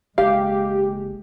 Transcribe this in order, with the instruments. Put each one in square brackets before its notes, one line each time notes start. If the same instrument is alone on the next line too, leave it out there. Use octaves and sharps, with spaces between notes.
[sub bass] F#1 [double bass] G#3 [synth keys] G4 [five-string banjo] F5